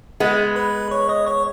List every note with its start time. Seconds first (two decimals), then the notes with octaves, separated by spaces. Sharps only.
0.20 G#3 B3
0.56 B4 B5
0.91 C#5 C#6
1.09 D#5 D#6
1.27 C#5 C#6